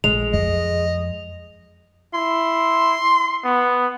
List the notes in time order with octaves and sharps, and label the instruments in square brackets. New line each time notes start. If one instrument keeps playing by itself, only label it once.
[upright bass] A#1 [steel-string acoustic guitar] G#3 [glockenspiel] F7
[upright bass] F2 [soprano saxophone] D#5
[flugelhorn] E4 [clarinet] C6
[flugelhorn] B3